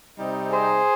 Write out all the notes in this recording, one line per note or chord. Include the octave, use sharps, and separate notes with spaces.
C3 G3 C4 D#4
G#4 C5